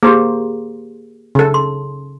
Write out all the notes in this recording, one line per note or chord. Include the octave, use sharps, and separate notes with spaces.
A#3 G4 G#4 C5
C#3 A4
C6